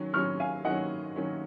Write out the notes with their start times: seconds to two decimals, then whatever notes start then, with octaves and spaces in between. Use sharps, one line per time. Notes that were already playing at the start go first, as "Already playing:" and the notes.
Already playing: D#3 F#3 C#4
0.13 D#3 F#3 C#4 C#6 F6
0.40 F5 G#5
0.65 D#3 F#3 C#4 D#5 F#5
1.16 D#3 F#3 C#4